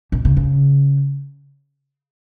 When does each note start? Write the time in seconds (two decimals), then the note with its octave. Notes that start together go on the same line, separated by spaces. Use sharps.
0.12 B2
0.25 C#3
0.37 C#3